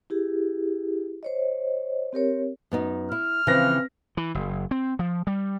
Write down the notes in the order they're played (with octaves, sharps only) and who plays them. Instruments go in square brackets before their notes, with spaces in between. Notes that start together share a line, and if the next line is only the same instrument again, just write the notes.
[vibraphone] E4 G4 G#4
C5 C#5 D#5
C4 G4 A#4 C#5
[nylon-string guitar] F#2 B3 D#4
[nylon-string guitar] E4 [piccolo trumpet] F6
[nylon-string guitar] C#3 E3 F3 [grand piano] C4 B4 A#6
[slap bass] E3
F#1
C4
F3
G3